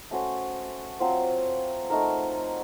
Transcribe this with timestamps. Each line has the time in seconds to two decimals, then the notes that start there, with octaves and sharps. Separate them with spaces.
0.11 A3 C#4 F#4 C5
1.00 F#3 C4 F4 C5
1.90 A3 D#4 A#4